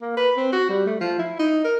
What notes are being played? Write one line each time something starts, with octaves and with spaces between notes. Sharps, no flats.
A#3
B4
C4
F#4
G3
A3
F3
E4
D#4
A#4